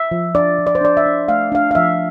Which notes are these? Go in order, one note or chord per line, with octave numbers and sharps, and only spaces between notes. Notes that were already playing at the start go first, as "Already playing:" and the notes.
Already playing: E5
F3
D4 D5
F3
D5
C5
D4 D5
E5
D4
A3 F5
D4 F5
F5
F3 E5